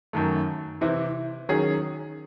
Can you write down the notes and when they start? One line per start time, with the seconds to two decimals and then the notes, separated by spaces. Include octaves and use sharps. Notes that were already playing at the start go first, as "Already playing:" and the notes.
0.13 F#2 D#3 A3
0.81 C3 E3 C4 E4
1.49 D#3 F#3 C#4 G#4